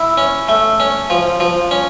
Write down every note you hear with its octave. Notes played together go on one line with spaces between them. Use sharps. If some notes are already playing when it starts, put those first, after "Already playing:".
Already playing: E4
C#4
A3
C#4
F3
F3
C#4